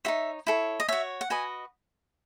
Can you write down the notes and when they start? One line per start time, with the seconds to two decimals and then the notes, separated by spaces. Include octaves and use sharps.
0.05 D#4 F#4 C#5 E5
0.47 E4 A4 C#5
0.80 D#5
0.88 F#4 C#5 E5
1.21 F#5
1.30 F#4 B4 D#5 G#5